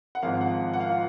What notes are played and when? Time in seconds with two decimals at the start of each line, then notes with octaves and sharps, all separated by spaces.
0.15 F#5
0.23 G#1 G#2 F3 F5
0.41 F#5
0.74 F#5
0.80 F5
0.90 F4